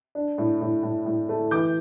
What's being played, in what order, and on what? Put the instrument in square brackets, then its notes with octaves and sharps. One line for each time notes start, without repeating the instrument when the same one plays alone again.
[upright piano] D4
A2
A2
A2
A2
A3
E3 D6 G6